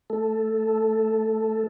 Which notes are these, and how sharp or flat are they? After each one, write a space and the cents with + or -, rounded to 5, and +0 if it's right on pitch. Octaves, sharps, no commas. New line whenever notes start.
A3 +0 A4 +0